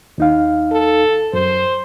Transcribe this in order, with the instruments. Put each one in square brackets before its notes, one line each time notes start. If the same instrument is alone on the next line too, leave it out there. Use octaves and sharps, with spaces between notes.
[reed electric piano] D#2 D#4 F5
[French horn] A4
[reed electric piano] F#2 [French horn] C5